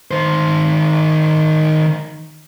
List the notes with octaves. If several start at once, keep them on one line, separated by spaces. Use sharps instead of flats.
D#3 C5